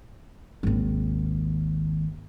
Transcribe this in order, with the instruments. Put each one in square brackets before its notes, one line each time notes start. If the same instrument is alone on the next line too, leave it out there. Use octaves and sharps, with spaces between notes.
[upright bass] G#1 D#2